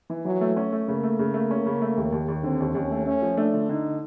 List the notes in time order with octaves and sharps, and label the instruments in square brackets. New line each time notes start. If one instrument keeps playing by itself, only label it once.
[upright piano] E3
[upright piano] E3 [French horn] F#3
[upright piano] A3
C#4
A3
[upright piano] C#3 [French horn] A#3
[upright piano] A3
C#3
A3
C#4
C#3
A3
D#2
D#2
D#2
[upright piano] D3 [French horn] C4
[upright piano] D#2
[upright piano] D#2 [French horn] C#4
[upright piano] A3
[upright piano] A3 [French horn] C#4
[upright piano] F3
[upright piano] A3 [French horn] D4
[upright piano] D3
[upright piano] D3 [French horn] D#4